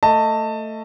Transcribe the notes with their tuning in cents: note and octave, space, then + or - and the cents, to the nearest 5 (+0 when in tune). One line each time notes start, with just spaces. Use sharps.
A3 +20 D#5 +5 A5 +20